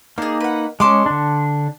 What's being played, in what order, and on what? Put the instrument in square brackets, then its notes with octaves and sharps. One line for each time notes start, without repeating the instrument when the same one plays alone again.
[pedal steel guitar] A#3 D#4 [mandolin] D4 G#4
[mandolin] B4 F#5
[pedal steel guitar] G#3 C#4 [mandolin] A5 C6 D6
[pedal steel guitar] D3 D4